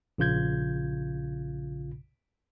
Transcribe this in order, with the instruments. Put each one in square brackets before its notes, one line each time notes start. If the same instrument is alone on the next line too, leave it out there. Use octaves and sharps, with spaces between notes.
[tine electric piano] A#1 C#3 F4 G6 G#6